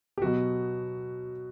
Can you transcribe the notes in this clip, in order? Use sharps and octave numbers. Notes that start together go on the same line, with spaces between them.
G4
B2 F#3 B3 F#4